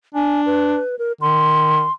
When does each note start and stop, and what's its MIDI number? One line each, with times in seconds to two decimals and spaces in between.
0.15 0.79 62
0.15 0.41 80
0.46 0.98 71
0.99 1.12 70
1.21 1.85 51
1.21 1.92 84